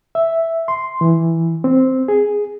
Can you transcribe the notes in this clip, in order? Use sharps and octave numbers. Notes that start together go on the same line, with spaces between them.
E5
C6
E3
C4
G#4